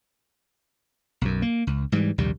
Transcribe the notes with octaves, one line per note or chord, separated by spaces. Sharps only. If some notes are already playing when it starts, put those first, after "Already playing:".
B1 F#2
A#3
C#2
G#2 E3 G3
A#1 D#2 C3 G3